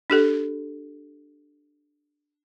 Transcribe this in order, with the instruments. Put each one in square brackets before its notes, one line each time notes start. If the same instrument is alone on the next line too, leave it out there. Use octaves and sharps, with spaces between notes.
[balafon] D4 G4 A4